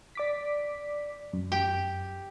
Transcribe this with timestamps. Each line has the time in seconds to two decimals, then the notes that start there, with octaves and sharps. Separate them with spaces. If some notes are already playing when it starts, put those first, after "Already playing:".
0.15 D5 D6 B6
1.33 F#2
1.52 G4